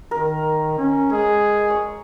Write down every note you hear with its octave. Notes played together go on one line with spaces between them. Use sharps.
D#3 A#4
C#4
G#3 G#4
C#5